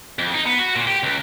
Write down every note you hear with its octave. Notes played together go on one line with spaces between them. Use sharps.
F2
D#4
B3
F#4
A#2
G4
C#2